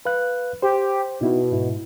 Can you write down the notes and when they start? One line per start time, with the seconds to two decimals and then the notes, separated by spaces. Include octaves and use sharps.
0.05 B4 F5 F#6
0.62 G4 C5
1.21 B2 D#4 E4
1.52 G#2 E4